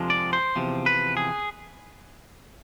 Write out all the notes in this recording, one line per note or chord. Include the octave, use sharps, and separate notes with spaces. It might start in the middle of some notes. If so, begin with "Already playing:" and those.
Already playing: F2 C3 F3 G#3 D4
D5
C5
E2 C3 F3
B4
G#4